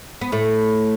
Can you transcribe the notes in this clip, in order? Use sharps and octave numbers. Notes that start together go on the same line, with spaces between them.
B3
A2 A3